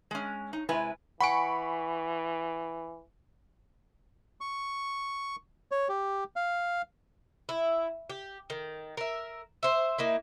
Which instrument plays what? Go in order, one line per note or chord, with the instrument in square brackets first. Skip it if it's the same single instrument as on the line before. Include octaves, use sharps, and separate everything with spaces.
[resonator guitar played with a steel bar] G#3 C#4
D#4
C3 G#3 E4 B4 G#5
[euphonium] E3 [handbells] F#5 G#5 [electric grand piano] B5 C#6 D7
[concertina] C#6
C#5
G4
F5
[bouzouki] E4
G4
D#3
A#4 E5
C5 E5
A#3 D#4 E4